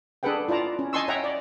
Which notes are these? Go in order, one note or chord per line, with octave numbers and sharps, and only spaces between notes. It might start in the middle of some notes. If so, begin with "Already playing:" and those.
D4 G#4 A4 B4 F#5 G5
E4 F4 D5 A5 A#5
C#4
D#5 G#5 A5 C6 C#6 E6
C#5 D#5 E5 F#5 G5 A#5
D5